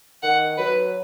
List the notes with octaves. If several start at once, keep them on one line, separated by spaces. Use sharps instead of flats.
D#3 F#5
F#3 B4